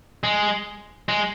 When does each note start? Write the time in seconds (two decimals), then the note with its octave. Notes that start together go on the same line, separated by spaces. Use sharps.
0.24 G#3
1.08 G#3